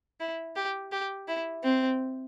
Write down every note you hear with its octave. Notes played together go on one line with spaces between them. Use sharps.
E4
G4
G4
E4
C4